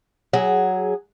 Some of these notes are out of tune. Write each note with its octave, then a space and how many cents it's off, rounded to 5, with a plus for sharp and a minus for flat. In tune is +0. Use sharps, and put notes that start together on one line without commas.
F#3 +5 G#4 +0